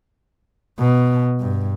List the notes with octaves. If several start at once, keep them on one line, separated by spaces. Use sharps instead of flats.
B2
G2